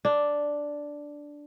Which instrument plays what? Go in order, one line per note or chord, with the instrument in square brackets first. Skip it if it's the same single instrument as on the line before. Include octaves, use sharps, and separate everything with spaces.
[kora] D4